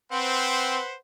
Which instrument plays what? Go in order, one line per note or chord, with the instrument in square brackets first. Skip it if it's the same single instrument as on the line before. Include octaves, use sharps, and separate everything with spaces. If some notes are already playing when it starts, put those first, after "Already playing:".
[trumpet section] C4 [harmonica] B4 C5 F#5